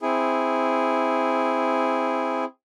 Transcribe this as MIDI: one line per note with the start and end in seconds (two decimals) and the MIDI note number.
0.02 2.45 60
0.02 2.45 64
0.02 2.45 68